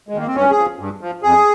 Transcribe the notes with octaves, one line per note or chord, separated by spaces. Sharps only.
G#3
D#3 A#3
C4
G2 C#4
G#4
F3
G2
F3
F2 G#4